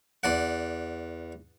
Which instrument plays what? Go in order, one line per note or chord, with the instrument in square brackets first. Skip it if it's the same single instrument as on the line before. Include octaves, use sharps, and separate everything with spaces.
[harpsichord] E2 D5 F#5